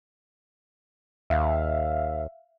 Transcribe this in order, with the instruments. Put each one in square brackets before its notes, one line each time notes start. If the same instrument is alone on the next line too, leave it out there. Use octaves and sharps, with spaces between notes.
[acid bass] D#2 [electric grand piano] E5 F5